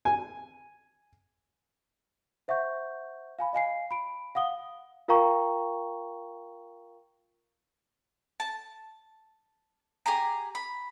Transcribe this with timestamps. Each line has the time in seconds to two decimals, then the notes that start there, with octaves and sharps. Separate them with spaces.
0.05 G#5
2.48 C5 E5 F#5 C#6 G6
3.39 F5 G#5 B5
3.53 D#5 F5 G#5 C7
3.91 B5 D7
4.35 F5 F#5 D#6 G7
5.08 F4 A#4 F5 G5 A#5 C#6
8.40 A5
10.06 G4 G#4 G#5 A#5
10.55 B5